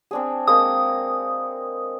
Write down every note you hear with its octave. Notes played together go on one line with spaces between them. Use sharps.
C4 D4 G#4
G#3 A#3 C4 D#6